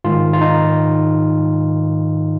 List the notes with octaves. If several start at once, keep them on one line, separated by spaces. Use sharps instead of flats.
G#2 D#3 F4
F4
D#4